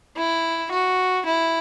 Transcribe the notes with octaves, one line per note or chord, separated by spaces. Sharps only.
E4
F#4
E4